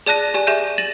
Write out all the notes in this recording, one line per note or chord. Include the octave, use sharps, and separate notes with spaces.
G#4 D5 A5 F#6 A#6 D#7
G4 D5 G#5
G4 G#4 E5 G#5 G6 D#7
A6 A#6 D#7 E7 F#7